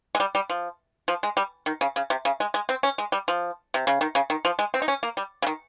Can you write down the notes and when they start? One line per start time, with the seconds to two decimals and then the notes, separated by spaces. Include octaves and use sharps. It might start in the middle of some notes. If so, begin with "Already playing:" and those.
0.15 G#3
0.20 G3
0.35 G3
0.50 F3
1.08 F3
1.23 G#3
1.37 G3
1.66 D#3
1.81 C#3
1.96 C#3
2.10 C3
2.25 C#3
2.40 G#3
2.54 G#3
2.69 C4
2.83 C#4
2.98 G#3
3.12 G3
3.28 F3
3.74 C3
3.87 C#3
4.01 D#3
4.15 C#3
4.30 D#3
4.45 F3
4.59 G#3
4.74 C4
4.82 D#4
4.88 C#4
5.03 A#3
5.17 G3
5.42 C#3
5.47 D#3